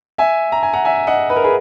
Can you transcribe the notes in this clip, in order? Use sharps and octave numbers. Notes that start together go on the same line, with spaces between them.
E5 G#5
A#5
G#5
F#5 A#5
E5 G#5
D#5 F#5
B4
A#4
G#4 B4